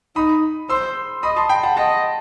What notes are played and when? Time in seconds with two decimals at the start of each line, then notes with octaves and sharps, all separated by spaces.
0.16 D#4 B5 D#6
0.69 C5 C6 E6
1.23 D#5 B5 D#6
1.36 A5 C6
1.49 G5 B5
1.63 F#5 A5
1.77 D#5 F#5 A5